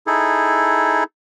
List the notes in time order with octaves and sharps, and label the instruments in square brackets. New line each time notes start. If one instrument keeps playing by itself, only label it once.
[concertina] D#4 E4 G#4 A4